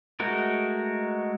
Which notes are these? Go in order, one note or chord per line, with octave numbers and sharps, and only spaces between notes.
G#3 A3 F#4 A#4